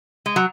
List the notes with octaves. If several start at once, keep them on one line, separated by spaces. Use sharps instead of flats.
G#3
F#3